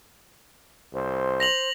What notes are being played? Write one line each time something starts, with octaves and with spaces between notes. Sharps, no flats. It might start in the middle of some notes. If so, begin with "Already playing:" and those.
C2 C5
A#6 F7 F#7